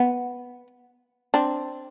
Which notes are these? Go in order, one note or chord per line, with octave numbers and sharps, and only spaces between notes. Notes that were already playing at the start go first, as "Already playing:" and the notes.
Already playing: B3
C4 D4